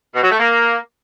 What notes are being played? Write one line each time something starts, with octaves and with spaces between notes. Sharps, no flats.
B2
F#3
A3
A#3